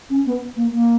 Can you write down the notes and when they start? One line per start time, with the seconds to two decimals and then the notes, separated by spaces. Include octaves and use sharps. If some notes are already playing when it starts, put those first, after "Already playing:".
0.09 C#4
0.25 B3
0.56 A#3
0.72 A#3